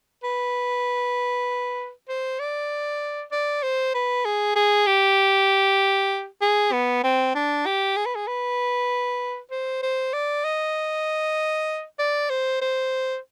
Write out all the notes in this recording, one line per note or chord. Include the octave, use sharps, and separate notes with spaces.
B4
C5
D5
D5
C5
B4
G#4
G#4
G4
G#4
B3
C4
D4
G4
G#4
B4
G#4
B4
C5
C5
D5
D#5
D5
C5
C5